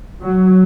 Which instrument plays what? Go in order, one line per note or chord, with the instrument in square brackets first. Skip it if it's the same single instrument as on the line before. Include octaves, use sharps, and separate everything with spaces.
[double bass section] F#3